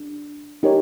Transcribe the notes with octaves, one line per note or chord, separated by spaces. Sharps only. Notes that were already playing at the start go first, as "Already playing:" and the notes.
Already playing: D4
D#4 G4 A#4 C#5